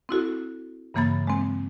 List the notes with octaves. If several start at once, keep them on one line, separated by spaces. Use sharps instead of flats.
C4 E4 F#4 A4
G2 C#3 E3 A#3 B5 A6
G#3 C4